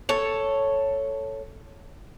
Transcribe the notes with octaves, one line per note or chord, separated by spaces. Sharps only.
A4 C#5